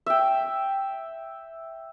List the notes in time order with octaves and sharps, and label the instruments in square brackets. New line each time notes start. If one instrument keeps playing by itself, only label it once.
[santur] E5 G5